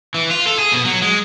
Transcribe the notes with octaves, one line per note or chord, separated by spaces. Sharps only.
E3
F4
A4
G#4
B2
F#3
G#3